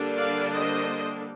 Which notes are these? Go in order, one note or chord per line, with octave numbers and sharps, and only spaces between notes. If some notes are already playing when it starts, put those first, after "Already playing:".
Already playing: D3 G3 A#3 D4
D5 F5
C5 D#5